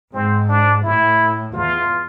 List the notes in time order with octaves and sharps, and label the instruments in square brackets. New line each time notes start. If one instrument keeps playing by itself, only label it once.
[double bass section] G#2 [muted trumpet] C4
[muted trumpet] D4
[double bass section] A2 [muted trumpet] E4
[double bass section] E2 [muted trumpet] F4